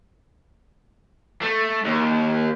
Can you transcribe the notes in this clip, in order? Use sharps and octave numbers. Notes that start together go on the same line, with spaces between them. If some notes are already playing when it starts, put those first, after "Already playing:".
A3
D#2